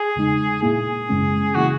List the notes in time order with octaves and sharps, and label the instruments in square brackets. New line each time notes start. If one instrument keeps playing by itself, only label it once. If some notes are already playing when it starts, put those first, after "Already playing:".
Already playing: [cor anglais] G#4
[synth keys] E2 C#3 G#3 D#4
[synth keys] A#2 A#3 E4 [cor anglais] G#4
[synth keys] G#1 F#2 C#3 G#3 C#4
[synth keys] C#3 E3 A#3 E4 [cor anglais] F#4